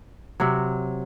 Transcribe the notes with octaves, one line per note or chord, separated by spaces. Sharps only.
C3 F#3